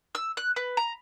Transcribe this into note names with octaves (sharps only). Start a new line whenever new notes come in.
E6
F#6
B4
A#5